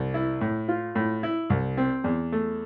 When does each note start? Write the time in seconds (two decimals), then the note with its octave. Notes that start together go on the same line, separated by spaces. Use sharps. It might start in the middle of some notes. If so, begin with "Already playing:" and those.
Already playing: C2
0.14 E4
0.41 A2
0.68 F4
0.95 A2
1.23 E4
1.50 C2
1.77 C4
2.04 E2
2.32 A3